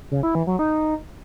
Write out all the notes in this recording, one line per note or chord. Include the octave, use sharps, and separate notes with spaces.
C#3
E4
E3
F#3
D#4